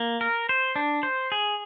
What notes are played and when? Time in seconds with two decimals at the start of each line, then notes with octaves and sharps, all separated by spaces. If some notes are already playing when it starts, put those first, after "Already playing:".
Already playing: A#3
0.21 A#4
0.49 C5
0.76 D4
1.03 C5
1.32 G#4